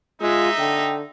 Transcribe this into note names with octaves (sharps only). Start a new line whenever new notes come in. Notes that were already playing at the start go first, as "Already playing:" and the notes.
G#3 D#4 F4 E5
D3 G5